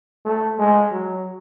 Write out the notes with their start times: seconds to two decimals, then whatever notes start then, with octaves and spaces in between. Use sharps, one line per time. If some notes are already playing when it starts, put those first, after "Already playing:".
0.25 A3
0.58 G#3
0.92 F#3